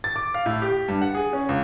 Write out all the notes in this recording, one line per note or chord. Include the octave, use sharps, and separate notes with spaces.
A6
D6
F5
A2
G4
G2
F#5
G#4
C#4
C#2